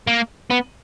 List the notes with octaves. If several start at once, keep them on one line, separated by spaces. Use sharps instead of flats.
A#3
B3